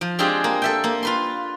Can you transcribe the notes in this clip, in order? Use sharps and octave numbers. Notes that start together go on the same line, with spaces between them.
F3
G#3 C4 D4 F4 G4 G#4
A#3
A4 E5 G5
A#3
F4 B4 C6